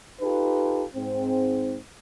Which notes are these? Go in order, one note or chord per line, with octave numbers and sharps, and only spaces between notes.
D#4 F4 G4 A4 B4
G#2 C4